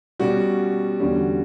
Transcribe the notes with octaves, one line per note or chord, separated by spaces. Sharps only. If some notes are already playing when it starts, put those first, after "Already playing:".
B2 G3 C#4 F#4
E2 D3 G3 C#4